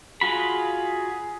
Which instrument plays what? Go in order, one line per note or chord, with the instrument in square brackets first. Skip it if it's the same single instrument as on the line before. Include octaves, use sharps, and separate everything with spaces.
[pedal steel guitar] F4 F#4 B5 [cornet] G#4